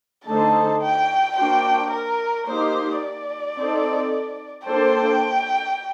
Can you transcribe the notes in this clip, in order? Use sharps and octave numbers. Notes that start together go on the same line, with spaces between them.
D3 A3 D#4 A4 C5 A5
G5
A#3 D4 F#4 C5 G5
A#4
A#3 D#4 G4 C5
D5
C4 D#4 A4
A#3 D4 A4 C5 G5